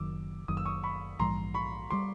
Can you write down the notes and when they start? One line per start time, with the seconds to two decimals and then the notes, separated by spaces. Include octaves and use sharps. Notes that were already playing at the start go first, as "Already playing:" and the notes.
Already playing: F#1 F#2 D#3 D6 E6
0.48 F#1 F#2 D#3 D#6
0.57 E6
0.65 C#6 D#6
0.84 B5 C#6
1.19 A#1 G#2 E3 G3 A#5 C6
1.54 B5 C#6
1.91 E3 G3 C6 D6